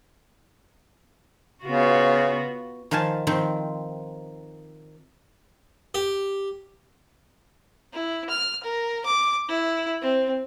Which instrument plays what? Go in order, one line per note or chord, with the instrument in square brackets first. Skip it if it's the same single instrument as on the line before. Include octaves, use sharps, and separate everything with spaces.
[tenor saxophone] C#3 [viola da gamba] B3 F4 F#4
[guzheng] D#3 F3 F5 G#5 A5
D#3 F3 C4
[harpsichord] G4
[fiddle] E4
F6
A#4
D6
E4
C4